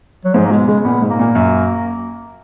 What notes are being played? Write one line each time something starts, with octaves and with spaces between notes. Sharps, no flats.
F#3
G#2 F3
A#3
B2 G#3
C#3 G#3
A#2 B3
G#2
A#3
A#2
F#2